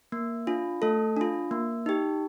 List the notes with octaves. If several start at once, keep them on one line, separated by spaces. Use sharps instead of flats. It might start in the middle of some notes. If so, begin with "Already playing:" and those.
A#3
D4 F4
A3 A4
D4 F4
A#3
D#4 G4